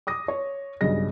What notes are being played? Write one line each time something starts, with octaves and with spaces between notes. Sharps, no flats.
D6 D#6 A#6
C#5
B1 G2 C#3 D#5 A#6